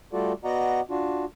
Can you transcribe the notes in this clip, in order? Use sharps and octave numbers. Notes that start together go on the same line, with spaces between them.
G3 A3 F4 F#4 A4 D5
B3 F#4 D5 D#5 F#5 A#5
D4 F4 F#4